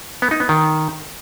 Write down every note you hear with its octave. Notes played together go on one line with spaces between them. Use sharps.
B3
D#4
B3
D#3